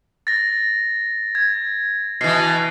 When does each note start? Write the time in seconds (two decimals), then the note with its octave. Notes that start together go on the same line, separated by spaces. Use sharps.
0.27 A6 A#6
1.35 G#6
2.21 B2 E3 C7